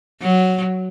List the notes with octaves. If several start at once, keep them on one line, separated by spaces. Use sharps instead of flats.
F#3